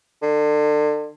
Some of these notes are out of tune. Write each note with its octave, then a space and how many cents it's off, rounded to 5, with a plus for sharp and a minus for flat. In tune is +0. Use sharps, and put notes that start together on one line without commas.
D3 +30